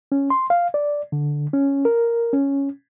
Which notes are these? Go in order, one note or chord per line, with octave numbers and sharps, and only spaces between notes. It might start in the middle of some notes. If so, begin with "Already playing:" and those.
C#4
C6
F5
D5
D3
C#4
A#4
C#4